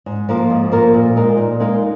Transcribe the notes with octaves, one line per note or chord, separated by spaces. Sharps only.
G#2
F3 A#3 F4 A#4
G#2
F3 A#3 F4 A#4
A#2
G#3 D#4 A#4 F5
A#2
G#3 D#4 A#4 F5